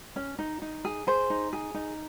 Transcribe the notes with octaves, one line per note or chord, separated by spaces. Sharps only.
C#4
D#4
D#4
G#4
G#4 C5
D#4
G#4
D#4